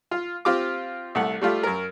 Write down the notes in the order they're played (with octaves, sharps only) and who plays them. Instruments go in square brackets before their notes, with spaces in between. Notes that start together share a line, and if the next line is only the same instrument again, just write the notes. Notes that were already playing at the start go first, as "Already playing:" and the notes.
[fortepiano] F4 F5
C4 F4 G4 D6
C2 A3 F#5
G3 A3 F4 G4
F#2 A#4